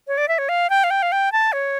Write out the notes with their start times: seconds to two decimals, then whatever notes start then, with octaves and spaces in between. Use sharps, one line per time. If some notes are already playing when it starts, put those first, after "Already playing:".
0.08 C#5
0.18 D5
0.28 E5
0.38 C#5
0.49 F5
0.70 G5
0.84 F5
0.90 G5
1.02 F5
1.12 G5
1.32 A5
1.53 C#5